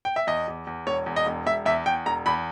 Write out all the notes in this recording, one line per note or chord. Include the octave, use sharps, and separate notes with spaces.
G5
E5
E2 D#5
E2
E2
E1 C#5
E2
D#5
E1
E1 E5
E2 E5
E2 G5
E1 A#5
E2 B5